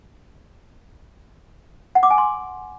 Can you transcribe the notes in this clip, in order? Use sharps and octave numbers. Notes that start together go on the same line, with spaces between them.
F#5
D6
G#5
C6